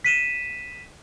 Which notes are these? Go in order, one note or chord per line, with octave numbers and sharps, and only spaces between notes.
B6 D#7 E7